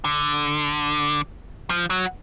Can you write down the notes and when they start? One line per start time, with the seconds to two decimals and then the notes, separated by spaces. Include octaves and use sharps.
0.04 D3
1.70 F3
1.90 F#3